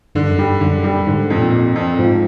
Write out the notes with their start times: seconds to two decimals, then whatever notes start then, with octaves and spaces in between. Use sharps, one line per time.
0.15 G2 D3
0.29 F#2
0.38 G2 G3
0.61 F#2 D3
0.84 G3
1.07 G#2 D3
1.30 F2
1.37 A#2
1.52 F2
1.76 F2
1.99 G#2 F3